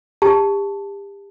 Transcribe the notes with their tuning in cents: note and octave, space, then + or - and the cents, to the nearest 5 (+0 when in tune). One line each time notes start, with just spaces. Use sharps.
G4 +35 A5 +0